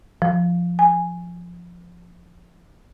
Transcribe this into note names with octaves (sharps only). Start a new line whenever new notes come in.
F3
G#5